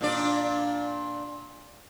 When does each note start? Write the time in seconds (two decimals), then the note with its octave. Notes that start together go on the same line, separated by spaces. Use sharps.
0.01 A#2 D4 D5